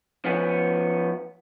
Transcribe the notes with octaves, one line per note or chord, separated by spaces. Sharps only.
F3 B3 C#4